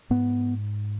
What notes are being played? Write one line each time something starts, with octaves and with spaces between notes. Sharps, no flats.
G#2 B3